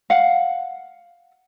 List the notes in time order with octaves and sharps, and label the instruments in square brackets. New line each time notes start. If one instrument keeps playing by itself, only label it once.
[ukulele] F5 F#5